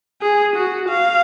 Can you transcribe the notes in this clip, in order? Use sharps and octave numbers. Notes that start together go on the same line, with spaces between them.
G#4
F#4
F5